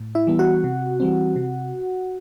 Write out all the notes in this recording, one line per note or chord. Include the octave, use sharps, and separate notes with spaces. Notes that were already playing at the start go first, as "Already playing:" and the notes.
Already playing: A2
E4 E5
E3 G3 B3
F#4 F#5
C3
E3 G3 C4
C3